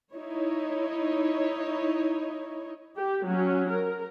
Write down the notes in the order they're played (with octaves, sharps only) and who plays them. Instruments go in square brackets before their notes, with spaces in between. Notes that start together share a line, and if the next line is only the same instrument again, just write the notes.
[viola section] D#4 E4 C#5
G4
F#3 C#4
A#4